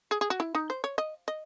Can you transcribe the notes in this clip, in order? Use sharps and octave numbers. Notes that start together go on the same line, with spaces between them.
G#4
G#4
F#4
E4
D#4
C5
C#5
D#5
D#5